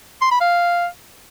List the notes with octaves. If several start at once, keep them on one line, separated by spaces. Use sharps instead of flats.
C6
B5
F5